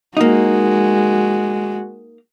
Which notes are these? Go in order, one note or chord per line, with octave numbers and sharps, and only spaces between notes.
G#3 A#3 D#4 F#4